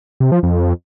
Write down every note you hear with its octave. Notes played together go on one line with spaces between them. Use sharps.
C3
F3
F2